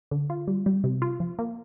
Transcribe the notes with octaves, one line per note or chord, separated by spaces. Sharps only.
D3
F4
G3
G3
C3
F4
F3
A#3